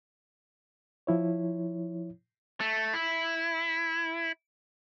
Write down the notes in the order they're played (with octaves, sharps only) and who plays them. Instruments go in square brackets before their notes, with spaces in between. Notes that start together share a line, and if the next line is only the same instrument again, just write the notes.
[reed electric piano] F3 E4 C#5
[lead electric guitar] A3
E4